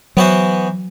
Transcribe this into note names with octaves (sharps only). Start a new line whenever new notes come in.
E3 F#3 B3 F#4 C5